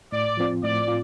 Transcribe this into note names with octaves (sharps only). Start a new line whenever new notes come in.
A2 D5
F3 C4 F4
A2 D5
F4